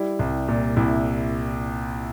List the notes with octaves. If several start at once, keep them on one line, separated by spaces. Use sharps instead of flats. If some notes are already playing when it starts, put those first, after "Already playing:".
Already playing: G3 E4
C2
A#2
C2 E4